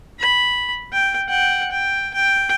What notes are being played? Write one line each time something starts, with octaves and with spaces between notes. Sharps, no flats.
B5
G5
F#5 G5
G5
G5